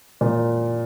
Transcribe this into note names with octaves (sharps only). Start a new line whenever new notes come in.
A#2